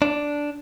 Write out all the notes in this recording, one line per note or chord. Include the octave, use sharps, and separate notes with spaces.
D4